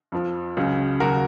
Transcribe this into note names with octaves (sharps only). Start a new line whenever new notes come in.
F2 F3
C#2 C#3 F#3
D#2 C#3 F#3 F#4 A#4